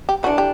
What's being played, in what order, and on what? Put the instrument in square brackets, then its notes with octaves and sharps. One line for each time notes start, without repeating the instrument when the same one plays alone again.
[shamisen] G4
[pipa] E3 A3 D4 [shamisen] F#4
[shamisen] G4